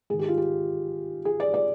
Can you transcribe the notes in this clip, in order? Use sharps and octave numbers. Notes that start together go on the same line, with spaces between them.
G#2 D#3 G#4
G4
F4
G4
G#4
D5
D5